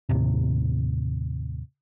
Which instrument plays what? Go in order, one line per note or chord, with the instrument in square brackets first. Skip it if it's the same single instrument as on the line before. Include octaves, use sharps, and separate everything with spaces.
[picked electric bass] D#2 A2 C3